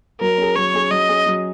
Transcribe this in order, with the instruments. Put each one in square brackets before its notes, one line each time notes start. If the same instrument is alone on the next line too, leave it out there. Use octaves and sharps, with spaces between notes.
[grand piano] F#3 [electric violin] A#4
[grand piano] C#4 G#4
[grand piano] F#3 [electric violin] C#5
[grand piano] C#4 G#4
[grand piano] F#3 [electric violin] D#5
[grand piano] C#4 G#4
F#3